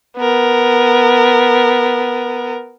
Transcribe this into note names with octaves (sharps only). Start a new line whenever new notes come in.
B3 A#4